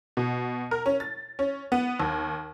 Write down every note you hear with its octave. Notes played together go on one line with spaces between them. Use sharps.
B2
A#4
C#4
A6
C#4
B3
D#2